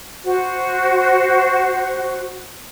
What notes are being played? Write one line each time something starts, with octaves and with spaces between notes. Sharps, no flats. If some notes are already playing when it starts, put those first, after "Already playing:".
F#4 C5